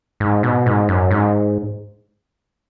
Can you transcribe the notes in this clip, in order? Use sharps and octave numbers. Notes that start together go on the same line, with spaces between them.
G#2
B2
G#2
F#2
G#2